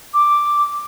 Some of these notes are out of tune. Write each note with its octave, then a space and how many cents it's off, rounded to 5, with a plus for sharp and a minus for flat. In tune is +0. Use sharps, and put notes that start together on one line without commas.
D6 +0